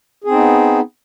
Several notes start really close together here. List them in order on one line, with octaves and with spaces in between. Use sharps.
G#4 C4 D#4 B3